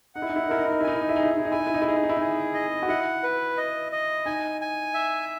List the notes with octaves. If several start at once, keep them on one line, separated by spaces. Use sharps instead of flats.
D#4 F#5
E4
D#4
E4
D#4
E4 A#4
D#4
E4
D#4
E4
D#4 G#5
E4
D#4
E4
D#4 G#4
E4
D#4
E4
D#4
E4 G#5
D#4
E4
D#4
E4
D#4 G#4
E4
D#4
E4
D#4 G#4
D#5
F#4
E4 F#5
B4
D#5
D#5
D#4 G#5
G#5
E5